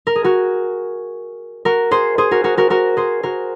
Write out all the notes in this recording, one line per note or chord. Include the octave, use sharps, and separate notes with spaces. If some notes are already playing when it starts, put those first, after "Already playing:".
A#4
G#4
F#4 A#4
F#4 A#4
G#4 C5
G#4 C5
F#4 A#4
F#4 A#4
F#4 A#4
F#4 A#4
G#4 C5
F#4 A#4